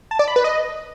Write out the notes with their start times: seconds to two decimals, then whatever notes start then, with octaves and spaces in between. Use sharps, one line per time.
0.11 A5
0.19 D5
0.28 B5
0.36 B4
0.44 D#5